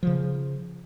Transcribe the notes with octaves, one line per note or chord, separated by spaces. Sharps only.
C#3 F3